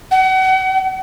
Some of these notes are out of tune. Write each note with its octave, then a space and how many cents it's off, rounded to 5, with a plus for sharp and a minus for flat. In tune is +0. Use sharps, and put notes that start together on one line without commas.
F#5 +35